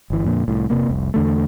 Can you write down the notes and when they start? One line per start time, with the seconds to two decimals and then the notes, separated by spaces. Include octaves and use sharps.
0.10 G1 E3
0.24 F2 A#2 D3
0.48 C2 A2
0.70 F1 C3 A#3
0.89 F1 C2
1.14 E2 D3 A3